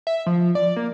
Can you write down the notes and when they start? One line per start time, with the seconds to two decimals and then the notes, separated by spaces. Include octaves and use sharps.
0.07 E5
0.26 F3
0.55 D5
0.76 A#3